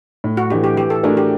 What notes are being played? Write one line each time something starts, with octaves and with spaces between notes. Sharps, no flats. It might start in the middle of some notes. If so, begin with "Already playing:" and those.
A2
F#4
E3 A3 D4 G4
G4
E3 G4
A4
A3 D4 F#4 G#4 A#4
G4